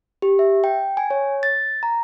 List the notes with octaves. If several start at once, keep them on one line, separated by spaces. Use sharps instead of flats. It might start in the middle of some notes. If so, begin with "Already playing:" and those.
G4
E5
G5
G#5
C#5
A6
A#5